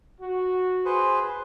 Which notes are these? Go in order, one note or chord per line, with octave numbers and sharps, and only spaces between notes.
F#4
G#4 B4 C5